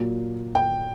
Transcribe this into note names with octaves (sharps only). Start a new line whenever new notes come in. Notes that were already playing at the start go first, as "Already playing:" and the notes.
Already playing: A#2 F#3 A#3
G5